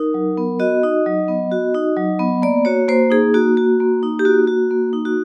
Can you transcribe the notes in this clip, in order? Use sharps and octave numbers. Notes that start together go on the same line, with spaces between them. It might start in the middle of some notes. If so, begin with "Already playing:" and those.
Already playing: D#4 A#4
F#3
B3
F#4 D#5
D#4
F#3
B3
F#4
D#4
F#3
B3
A#3 D5
F#4 C#5
A#3 C5
D#4 G#4
A#3 F#4
F#4
A#3
D#4
G4
A#3 F#4
F#4
A#3
D#4
F#4